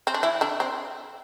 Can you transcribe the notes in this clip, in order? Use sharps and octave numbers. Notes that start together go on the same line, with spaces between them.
C4
D4
E3 E4
D3 D4
C4